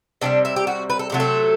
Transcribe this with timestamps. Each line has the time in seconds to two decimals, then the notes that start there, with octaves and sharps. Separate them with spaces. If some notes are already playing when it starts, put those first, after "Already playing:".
0.21 C3 E3 G3 D4
0.45 E4
0.56 G4
0.67 F#4
0.90 B4
0.99 A4
1.10 C3 F#3 A3 G4
1.20 A4